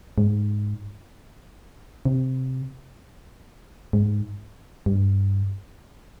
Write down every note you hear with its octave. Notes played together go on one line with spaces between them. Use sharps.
G#2
C3
G#2
G2